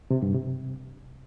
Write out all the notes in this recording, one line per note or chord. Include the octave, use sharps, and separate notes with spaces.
C3
G2
C3